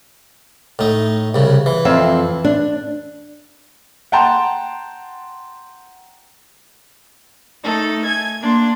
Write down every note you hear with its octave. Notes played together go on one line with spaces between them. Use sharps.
A2 D#4
C2 C#3
E3
F2 C4 E5
D4
F#5 G5 A5 A#5 C6
A3 D#4 A4
G#5 G#6
A#3 D4 C6